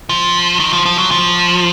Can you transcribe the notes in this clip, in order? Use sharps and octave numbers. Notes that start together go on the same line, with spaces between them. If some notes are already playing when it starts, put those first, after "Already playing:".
F3
D#3
F3
F3
F#3
F3